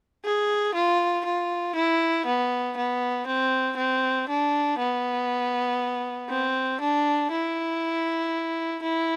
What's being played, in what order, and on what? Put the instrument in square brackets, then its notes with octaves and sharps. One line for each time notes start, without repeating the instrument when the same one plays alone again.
[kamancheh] G#4
F4
F4
E4
B3
B3
C4
C4
D4
B3
C4
D4
E4
E4